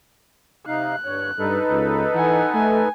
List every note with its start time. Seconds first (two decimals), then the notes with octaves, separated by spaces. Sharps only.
0.67 C3 D#4 F5 F#6
1.05 G2 D3 C#5
1.39 G2 D#4 A4 B4
1.70 C#2
2.14 E3 F#5 G#5
2.54 A3 G#5